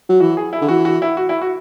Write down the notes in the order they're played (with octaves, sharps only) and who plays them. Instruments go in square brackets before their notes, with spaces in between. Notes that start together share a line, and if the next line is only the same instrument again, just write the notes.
[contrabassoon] F#3
[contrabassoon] E3 [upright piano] F#4
[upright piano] G#4
E4
[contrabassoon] D3
[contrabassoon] E3 [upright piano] F#4
[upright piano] F#4
E4
F#4
E4
F#4